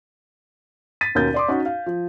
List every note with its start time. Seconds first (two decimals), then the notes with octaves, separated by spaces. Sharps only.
1.01 A6 B6 D#7
1.15 D#2 B2 C#4 A#4 G6 A6
1.34 D5 C6 D6
1.48 C#4 D#4 F#4
1.66 F5
1.86 F3